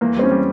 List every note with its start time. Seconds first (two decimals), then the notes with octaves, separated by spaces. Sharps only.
0.01 E2 A#3
0.16 G3 C4
0.23 C#4
0.31 G3